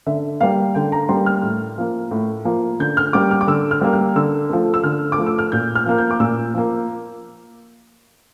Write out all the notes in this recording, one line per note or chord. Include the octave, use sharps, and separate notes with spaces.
D3 E5
G3 A#3 F5
D3 G5
A#5
G3 A#3 C6
F6
A2
F3 A#3
A2
F3 A#3
D3 G6
F6
G3 A#3 D6
F6
D6
D3 E6
F6
G3 A#3
F6
D3 E6
F3 A3
E6
D3 F6
D6
F3 A3
E6
F6
A#2 G6
F6
F3 A#3
G6
D6
A#2 E6
F3 A#3